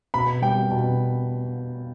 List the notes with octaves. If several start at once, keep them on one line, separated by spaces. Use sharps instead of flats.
B2 B5
G3 G5
B2